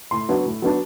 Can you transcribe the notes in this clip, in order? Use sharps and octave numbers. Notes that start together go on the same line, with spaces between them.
A2 C6
F#3 B3 D4
A2
F#3 B3 D4